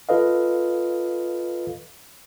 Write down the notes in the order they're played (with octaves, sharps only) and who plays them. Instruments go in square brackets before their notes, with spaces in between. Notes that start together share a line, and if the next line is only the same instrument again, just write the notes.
[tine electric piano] F4 A4 B4 D#5 F5